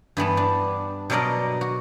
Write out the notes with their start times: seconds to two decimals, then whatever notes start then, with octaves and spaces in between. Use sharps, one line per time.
0.17 G2 E3 B3 A5
0.37 D4
1.10 B2 F#3 D4 A#4 D5 D#5
1.61 F#4